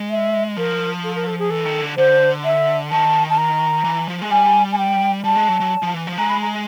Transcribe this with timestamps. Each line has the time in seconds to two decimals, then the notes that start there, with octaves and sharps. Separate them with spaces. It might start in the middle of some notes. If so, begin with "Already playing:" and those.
Already playing: G#3
0.10 E5
0.57 F3 A#4
1.04 A4
1.16 A#4
1.27 A4
1.39 G#4
1.50 E3 A4
1.66 D#3
1.81 D3
1.97 D3 C5
2.44 E5
2.91 D#3 A5
3.30 A5
3.37 A#5
3.84 E3
4.08 F3
4.22 G#3
4.30 G3 G#5
4.72 G#5
4.78 G5
5.24 G3 A5
5.36 G#3
5.49 F#3
5.60 F#3
5.83 F3
5.94 E3
6.07 F3
6.18 G#3 A#5
6.29 B5
6.42 A#5